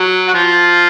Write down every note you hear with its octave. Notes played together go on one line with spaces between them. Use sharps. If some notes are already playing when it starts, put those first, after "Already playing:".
Already playing: F#3
F#4
F3 F4